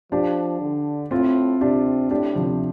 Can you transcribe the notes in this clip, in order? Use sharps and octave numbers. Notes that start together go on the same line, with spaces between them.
F3 D4 G4
D3
A2 C4 F4
C3 D4 G4
A2 D4 G4
C3 F3